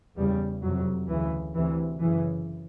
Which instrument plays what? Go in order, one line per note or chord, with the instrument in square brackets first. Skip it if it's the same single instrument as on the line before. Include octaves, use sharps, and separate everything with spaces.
[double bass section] E2 C#3 G3
F2 C3 F#3
D2 C#3 E3
D2 C3 E3
F#2 C#3 E3